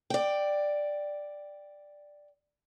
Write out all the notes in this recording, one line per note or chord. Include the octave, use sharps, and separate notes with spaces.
D5 G5